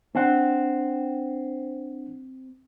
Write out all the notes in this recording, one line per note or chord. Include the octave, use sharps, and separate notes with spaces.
C4 D4 F#5